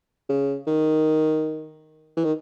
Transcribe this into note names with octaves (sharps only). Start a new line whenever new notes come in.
C#3
D#3
E3
D#3